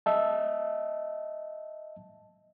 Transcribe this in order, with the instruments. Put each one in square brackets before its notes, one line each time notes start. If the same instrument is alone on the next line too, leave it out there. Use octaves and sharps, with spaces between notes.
[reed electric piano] D#5 E5 A5